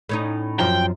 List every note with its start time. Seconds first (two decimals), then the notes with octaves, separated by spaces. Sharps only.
0.09 A2 C#4 D#4
0.59 F#2 F3 G5 A#5